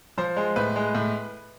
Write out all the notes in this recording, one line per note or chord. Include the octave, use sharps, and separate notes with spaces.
F3 C5
G#3
A2 B4
G#3
A2